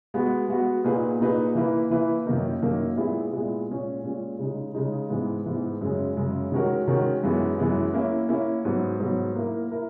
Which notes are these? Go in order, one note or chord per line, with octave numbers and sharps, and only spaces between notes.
G#3 B3 F#4
G#3 B3 F#4
A#2 A#3 D#4 G#4 B4
A#2 A#3 D#4 G#4 B4
E3 A#3 E4 B4
E3 A#3 E4 B4
F#2 D#3 A#3 D#4 A#4
F#2 D#3 A#3 D#4 A#4
A#2 G#3 B3 E4 G#4
A#2 G#3 B3 E4 G#4
A#2 G#3 C#4
A#2 G#3 C#4
C#3 G#3 D#4
C#3 G#3 D#4
G#2 E3 G#3 B3
G#2 E3 G#3 B3
F#2 C#3 G#3
F#2 C#3 G#3
D#3 G#3 C#4 F#4 A#4
D#3 G#3 C#4 F#4 A#4
F#2 E3 G#3 B3
F#2 E3 G#3 B3
A#3 C#4 E4
A#3 C#4 E4
G#2 F#3 B3
G#2 F#3 B3
A#3 E4 A#4
E4 A#4